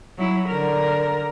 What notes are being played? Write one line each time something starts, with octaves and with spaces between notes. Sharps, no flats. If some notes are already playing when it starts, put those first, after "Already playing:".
F#3 E4
D3 A#4